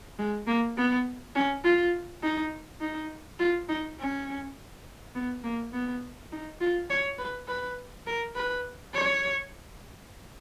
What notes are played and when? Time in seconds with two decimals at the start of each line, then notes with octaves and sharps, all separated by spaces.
0.18 G#3
0.47 A#3
0.77 B3
1.35 C#4
1.64 F4
2.23 D#4
2.81 D#4
3.39 F4
3.68 D#4
3.99 C#4
5.15 B3
5.44 A#3
5.73 B3
6.32 D#4
6.61 F4
6.90 C#5
7.19 B4
7.48 B4
8.07 A#4
8.36 B4
8.94 C#5